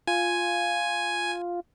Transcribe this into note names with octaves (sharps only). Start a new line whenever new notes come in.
F4 G#5